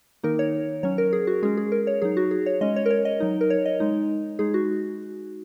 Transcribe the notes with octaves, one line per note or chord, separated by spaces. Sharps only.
D#3 A#3 D#4 A#4
C#5
F#3 C#4 C#5
A#4
G#4
F#4
G#3 C#4 G#4
G#4
A#4
C#5
F#3 D#4 G#4
F#4
G#4
C#5
G#3 C#4 D#5
C#5
A#4
C#5
D#5
F#3 D#4
A#4
C#5
D#5
G#3 D#4
G#3 D#4 G#4
F#4